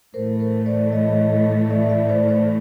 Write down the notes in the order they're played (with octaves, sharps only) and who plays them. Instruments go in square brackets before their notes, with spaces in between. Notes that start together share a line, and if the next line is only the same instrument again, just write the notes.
[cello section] A2 E3 A3 [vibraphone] A#4 C5
[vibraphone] A#4 C5
C5 D5
C#5 D#5
D5 E5
D5 E5
C5 D5
C5 D5